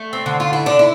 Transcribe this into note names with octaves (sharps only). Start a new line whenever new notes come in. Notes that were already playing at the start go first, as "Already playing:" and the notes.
Already playing: A3
C4
D3
F4
E4
D3 D4
E4